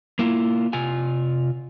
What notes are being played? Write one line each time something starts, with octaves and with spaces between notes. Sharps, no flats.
A#3 E4 F4
C3 F4 G#5